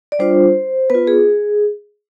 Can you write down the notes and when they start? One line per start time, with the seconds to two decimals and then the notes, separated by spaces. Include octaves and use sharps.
0.12 D5
0.19 G3 D4 F4 C5
0.90 B3 F4 B4
1.07 G#4